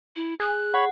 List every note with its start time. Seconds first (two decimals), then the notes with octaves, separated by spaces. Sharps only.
0.16 E4
0.40 G#4 F#6
0.74 C#5 F#5 B5